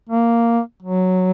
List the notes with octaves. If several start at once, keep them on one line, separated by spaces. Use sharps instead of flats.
A#3
F#3